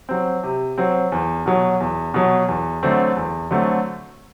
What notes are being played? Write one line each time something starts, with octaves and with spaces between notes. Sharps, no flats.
F#3 C4
C3
F#3 C4
E2
B2 F#3
E2
B2 F#3
E2
D3 F#3 A3 C4
E2
D3 F#3 A3 C4